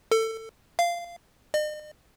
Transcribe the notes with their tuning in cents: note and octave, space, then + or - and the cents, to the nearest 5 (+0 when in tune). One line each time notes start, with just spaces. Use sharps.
A4 +25
F5 -15
D#5 -45